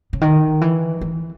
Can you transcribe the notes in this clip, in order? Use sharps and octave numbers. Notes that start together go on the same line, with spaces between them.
C#3
D#3
E3
E3